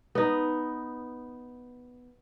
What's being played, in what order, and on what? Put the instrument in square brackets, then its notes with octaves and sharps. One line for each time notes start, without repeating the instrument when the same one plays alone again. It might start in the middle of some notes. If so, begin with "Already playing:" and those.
[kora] B3 D#4